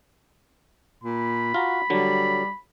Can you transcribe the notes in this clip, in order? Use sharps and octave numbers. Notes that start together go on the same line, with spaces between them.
A#2 B5
F4 F#4 A#5
D3 F#3 G3